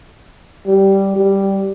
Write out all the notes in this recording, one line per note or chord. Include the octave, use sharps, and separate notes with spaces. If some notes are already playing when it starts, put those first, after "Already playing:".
G3
G3